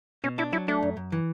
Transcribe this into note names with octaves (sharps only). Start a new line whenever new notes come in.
B2 C#4
D4 E4
F#3 E4
A3 D4
F#2
F#2
E3